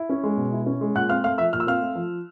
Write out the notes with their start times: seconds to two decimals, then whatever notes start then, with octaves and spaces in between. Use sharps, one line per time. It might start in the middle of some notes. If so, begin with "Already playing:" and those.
Already playing: E4
0.09 C#4
0.23 G#3
0.37 B2
0.52 E4
0.66 C#4
0.81 G#3
0.95 A#2 F#5 F#6
1.09 C4 F5 F6
1.24 A3 F5 F6
1.38 F3 E5 E6
1.53 A#2 F6
1.60 E6
1.67 C4 F5 F6
1.81 A3
1.95 F3